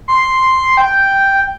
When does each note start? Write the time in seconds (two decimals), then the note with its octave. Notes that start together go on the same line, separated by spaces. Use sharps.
0.08 C6
0.77 G5